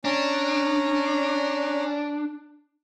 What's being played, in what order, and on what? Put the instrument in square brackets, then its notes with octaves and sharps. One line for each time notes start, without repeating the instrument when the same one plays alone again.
[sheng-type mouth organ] C#4 A#5 [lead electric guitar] D4